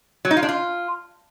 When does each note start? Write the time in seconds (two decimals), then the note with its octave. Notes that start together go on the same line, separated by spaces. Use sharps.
0.25 F#3
0.31 D#4
0.37 F4
0.43 D4
0.49 F4